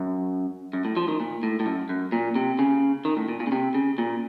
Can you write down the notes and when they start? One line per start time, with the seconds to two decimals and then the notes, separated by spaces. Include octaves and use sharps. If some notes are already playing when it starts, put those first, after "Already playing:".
Already playing: F#2
0.73 F#2
0.85 A2
0.97 F3
1.08 D#3
1.20 A#2
1.43 A2
1.60 A2
1.66 F#2
1.89 F#2
2.12 A#2
2.35 C3
2.59 C#3
3.05 D#3
3.17 A2
3.28 A#2
3.40 A#2
3.47 C#3
3.52 C3
3.74 C#3
3.98 A#2